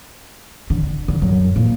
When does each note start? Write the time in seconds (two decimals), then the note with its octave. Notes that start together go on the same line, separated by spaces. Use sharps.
0.70 D3
1.08 D3
1.22 F#2
1.56 A#2